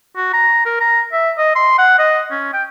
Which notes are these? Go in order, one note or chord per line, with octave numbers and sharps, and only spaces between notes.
F#4
A#5
A#4
A#5
E5
D#5
C6
F#5
D#5
C#4
G5